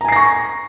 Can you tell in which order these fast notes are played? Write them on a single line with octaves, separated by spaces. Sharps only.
A#5 G#5 C7 A#6 C#6